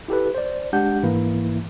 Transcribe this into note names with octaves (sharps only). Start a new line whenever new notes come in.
E4 G4 A4 B4
C5 D5
G#3 D4 G4 F#5 G6
G#2 E3 A#3 E4